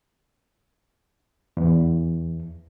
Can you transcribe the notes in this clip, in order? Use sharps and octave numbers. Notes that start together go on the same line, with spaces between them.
E2